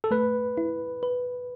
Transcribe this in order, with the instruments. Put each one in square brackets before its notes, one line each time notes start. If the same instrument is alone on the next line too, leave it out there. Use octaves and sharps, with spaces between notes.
[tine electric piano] A4
[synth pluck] A3 [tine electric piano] B4
[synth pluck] E4
B4